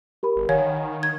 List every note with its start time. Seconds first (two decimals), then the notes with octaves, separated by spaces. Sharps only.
0.23 G4 A#4 B5
0.36 G1
0.49 D#3 C#5 F5 F#5 G#5
1.03 G#6